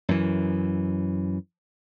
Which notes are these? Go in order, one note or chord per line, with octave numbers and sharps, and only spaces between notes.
F#2 E3